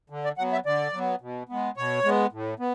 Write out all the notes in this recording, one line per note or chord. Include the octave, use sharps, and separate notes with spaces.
D3
D5
F#3 B3 F#5
E5
D3 D5
F#3 B3
B2
G#3 B3
B2 C#5
G#3 B3
A2
B3